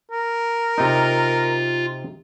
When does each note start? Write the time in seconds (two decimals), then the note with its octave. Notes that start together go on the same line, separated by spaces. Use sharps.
0.11 A#4
0.78 C3 D#4 F4